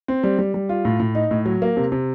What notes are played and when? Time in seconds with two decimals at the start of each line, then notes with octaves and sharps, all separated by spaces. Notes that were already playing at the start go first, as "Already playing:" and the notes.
0.08 C4
0.24 G3
0.38 G3
0.54 G3
0.69 F4
0.85 A2
1.00 A2
1.15 D#4
1.31 A2
1.46 F#3
1.62 A#3
1.77 C3
1.92 C3